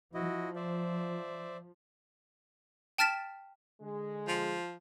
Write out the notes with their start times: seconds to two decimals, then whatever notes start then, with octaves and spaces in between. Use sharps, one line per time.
0.14 F3 E4 F#4 D#5
0.56 C5 D5 E5
2.98 G5 A5 F6 A6 B6 E7
3.81 D3 G#3
4.28 F3